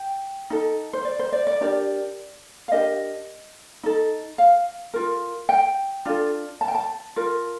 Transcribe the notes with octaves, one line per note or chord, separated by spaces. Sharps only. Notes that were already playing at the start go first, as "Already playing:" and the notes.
Already playing: G5
D#4 A4
C5
D5
C5
D5
D5
D4 G4 A#4 D5
F5
D4 G4 A#4 D#5
D#4 A4
F5
F4 A#4
G5
D4 F4 A4
A5
G5
A5
F4 A#4